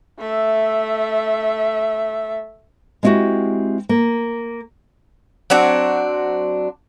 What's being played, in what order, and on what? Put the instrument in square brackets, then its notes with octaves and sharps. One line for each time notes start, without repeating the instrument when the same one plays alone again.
[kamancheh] A3 E5
[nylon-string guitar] G#3 C4 D#4 E4 F#4 G4
A#3
[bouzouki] F#3 C4 D4 F#4